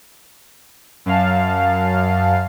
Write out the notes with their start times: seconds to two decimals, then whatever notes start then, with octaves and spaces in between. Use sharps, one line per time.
1.06 F#2 F5 A5